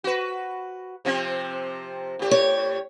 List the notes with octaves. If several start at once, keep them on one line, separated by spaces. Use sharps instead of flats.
F#4 B4
C3 F3 C4
A2 G4
C#5